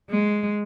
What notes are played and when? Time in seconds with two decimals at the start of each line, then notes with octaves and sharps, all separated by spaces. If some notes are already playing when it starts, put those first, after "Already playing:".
0.11 G#3